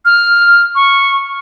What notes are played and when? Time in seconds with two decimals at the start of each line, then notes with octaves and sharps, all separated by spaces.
0.05 F6
0.75 C#6